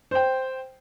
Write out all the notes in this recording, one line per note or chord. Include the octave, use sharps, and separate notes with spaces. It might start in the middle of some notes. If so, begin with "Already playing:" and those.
C5 G5